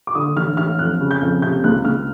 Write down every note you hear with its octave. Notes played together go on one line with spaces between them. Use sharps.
D6
D3 D#6
A1 F6
A1 F6
F2 F#6
C#3
G6
F2
C3 G6
C#2 F#6
C#2 F6